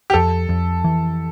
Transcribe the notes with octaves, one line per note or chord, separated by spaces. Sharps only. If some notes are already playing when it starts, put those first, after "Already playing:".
G4
F2 A4
F2
E3